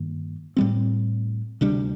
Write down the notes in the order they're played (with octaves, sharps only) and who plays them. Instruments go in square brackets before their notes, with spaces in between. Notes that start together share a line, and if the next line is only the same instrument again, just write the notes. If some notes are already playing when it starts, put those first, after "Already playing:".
Already playing: [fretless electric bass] G2 D#3 A#3
A2 G3 C4
D2 C3 G3 D4